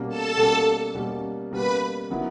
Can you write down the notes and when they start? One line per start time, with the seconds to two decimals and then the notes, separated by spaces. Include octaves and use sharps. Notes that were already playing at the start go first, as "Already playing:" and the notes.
Already playing: B2 G3 A#3 C#4
0.09 A4 A5
0.37 B2 G3 A#3 C#4
0.95 B2 G3 A#3 C#4
1.52 B2 G3 A#3 C#4 B4 B5
2.10 D#3 F#3 B3 E4